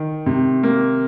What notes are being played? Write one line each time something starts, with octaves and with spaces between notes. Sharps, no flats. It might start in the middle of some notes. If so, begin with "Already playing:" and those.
Already playing: D#3
C3
A#3